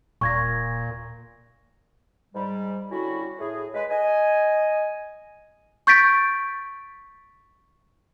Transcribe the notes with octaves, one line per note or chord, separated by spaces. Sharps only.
D#1 A#2 C#6 G#6 A#6
G#2 G3
D3 G3 C#4 E4 F#4
A2 G#4
G#3 B4
D#5 G#5
C#6 G6 A6 B6 D7